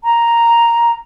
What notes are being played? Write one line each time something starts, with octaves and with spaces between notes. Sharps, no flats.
A#5